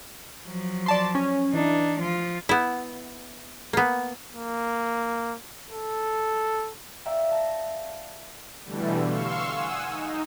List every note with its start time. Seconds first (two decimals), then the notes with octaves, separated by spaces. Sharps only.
0.46 F3 F#3
0.86 D5 A5 C6
1.15 C#4
1.54 E3 D4 D#4
2.00 F3 F4
2.49 B3 E4
3.73 A#3 B3
4.33 A#3
5.71 A4
7.05 D5 E5 F5 G5 A#5
7.31 A5 A#6
8.65 B2 D3 E3 G3 A3
9.05 F5 C6 C#6 E6
9.51 F#5 G#5 D#6 E6
9.87 D#4